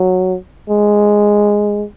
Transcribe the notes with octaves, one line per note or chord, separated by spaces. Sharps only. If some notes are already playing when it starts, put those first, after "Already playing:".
Already playing: F#3
G#3